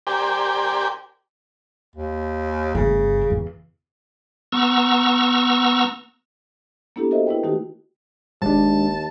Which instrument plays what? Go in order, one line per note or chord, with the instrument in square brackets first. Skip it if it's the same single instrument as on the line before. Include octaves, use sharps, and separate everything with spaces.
[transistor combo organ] G4 A#4 C5 D5 G5 G#5
[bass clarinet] D#2
[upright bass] G1 A3 [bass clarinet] C#3
[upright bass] E2
[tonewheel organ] B3 A#5 C#6 E6
[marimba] A#3 B3 D4 E4 G4 A4
F#4 A4 A#4 C5 D#5 E5
E4 B4 G5
D#3 A3 D#4 F#4 G4
[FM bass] E1 [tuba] D#2 [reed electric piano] G#3 D4 [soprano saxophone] A5